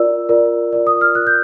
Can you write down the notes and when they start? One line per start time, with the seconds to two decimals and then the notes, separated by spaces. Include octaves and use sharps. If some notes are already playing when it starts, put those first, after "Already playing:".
Already playing: F4 A#4 D5 E6
0.29 F4 A#4 D5
0.73 F4 A#4 D5
0.87 D#6
1.01 F6
1.15 F4 A#4 D5 F#6
1.27 G6